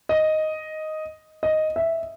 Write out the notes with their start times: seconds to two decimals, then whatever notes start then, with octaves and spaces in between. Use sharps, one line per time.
0.09 D#5
1.43 D#5
1.76 E5